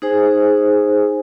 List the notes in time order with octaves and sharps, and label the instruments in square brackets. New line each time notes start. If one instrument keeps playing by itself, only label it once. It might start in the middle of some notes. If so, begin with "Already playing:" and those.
[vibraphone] D#4 G#4 C5 G#5